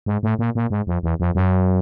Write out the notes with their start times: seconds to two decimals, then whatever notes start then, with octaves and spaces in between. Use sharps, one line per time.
0.06 G#2
0.23 A2
0.39 A#2
0.55 A#2
0.70 G#2
0.87 F2
1.03 E2
1.20 F2
1.35 F#2